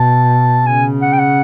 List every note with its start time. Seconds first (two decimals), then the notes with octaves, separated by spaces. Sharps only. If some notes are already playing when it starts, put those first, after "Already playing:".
Already playing: B2 A5
0.66 C#3 G#5
1.01 F#5
1.13 G5
1.19 F#5